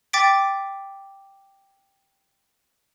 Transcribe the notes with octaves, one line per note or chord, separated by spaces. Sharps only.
G5 D6 A6 B6 D7